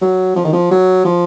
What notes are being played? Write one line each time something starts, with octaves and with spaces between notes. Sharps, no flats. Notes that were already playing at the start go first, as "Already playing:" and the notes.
F#3
F3
D#3
F3
F#3
F3